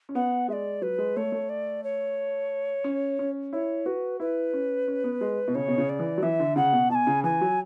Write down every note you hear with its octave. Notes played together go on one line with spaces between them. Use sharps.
C#4
B3 F#5
G#3 D5 E5
F#3 B4
G#3
A3 C#5
A3
D5
C#5
C#4
C#4
E4 C#5
F#4 B4
E4 B4
C#4
C#4
B3
G#3
B2
C#3 C#5
B2
C#3
D5
E3
F#3
E3 E5
D3
C#3 F#5
B2
B2 G#5 A5
C#3
E3 G#5
F#3